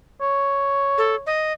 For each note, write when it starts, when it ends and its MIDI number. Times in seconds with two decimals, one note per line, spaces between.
0.22 1.28 73
0.98 1.15 69
1.26 1.53 75